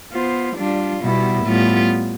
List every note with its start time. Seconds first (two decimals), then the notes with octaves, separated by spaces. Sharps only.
0.13 B3 F4 C5
0.57 G3 D4 F4
1.01 B2 G3 B3 E4
1.45 A2 G3 B3 F4